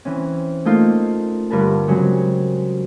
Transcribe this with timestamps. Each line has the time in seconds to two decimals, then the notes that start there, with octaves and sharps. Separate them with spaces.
0.05 E3 C4 C#4
0.65 A3 A#3 D#4 F4
1.50 G2 D3 A#4 B4 A5
1.88 C#3 F#3 G#3 C4